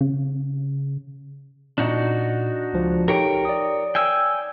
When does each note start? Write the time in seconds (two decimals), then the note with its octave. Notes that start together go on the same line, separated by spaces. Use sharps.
0.01 C#3
1.78 A#2 D4 D#4 F#4
2.73 C#2 F3
3.08 D#4 G4 A4 A#4 C#5 G5
3.45 D5 D#6
3.95 G5 G#5 E6